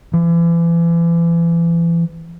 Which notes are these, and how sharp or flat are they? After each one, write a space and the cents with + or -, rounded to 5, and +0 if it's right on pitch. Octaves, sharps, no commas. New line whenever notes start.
E3 +35